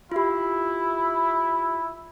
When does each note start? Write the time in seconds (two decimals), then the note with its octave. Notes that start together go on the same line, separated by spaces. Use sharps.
0.12 E4 F4 G4